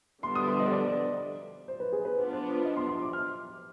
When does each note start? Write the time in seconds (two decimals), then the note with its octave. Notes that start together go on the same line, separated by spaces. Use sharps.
0.23 D3 G3 B3 D4 C6
0.35 D#6
0.48 C6
0.60 D#5
0.72 D5
1.68 C5
1.80 B4
1.93 G#4
2.05 B4
2.17 B3 D4 F4 C5
2.33 C5
2.65 D#5
2.77 C6
2.89 C6
3.02 D6
3.13 F6